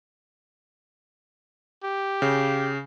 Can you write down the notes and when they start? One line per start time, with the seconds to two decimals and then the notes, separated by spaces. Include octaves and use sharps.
1.84 G4
2.22 C#3